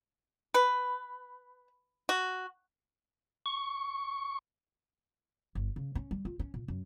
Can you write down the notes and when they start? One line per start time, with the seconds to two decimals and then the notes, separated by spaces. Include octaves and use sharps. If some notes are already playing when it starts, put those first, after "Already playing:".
0.54 B4
2.09 F#4
3.46 C#6
5.55 G1
5.76 C#3
5.95 C#4
6.11 G3
6.25 F4
6.39 C#4
6.54 A#2
6.68 F#2